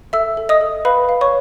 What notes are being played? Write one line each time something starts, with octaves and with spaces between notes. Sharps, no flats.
A4 E5 E6
A4
D#5 D#6
A4
B4 F5 B5
F5
C#5 C#6